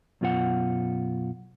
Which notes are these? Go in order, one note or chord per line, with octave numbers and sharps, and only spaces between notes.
F#2 B2 F4 A4 F#5